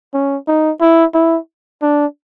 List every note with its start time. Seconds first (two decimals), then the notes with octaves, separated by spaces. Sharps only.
0.14 C#4
0.47 D#4
0.81 E4
1.14 E4
1.82 D4